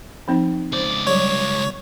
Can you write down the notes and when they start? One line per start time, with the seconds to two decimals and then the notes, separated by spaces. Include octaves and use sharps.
0.28 F3 C4 D#4
0.73 C#2 C5 D5
1.07 F#3 G3 C#5